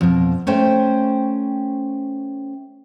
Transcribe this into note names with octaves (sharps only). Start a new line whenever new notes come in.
F2 B2
A3 C#4 C5 G5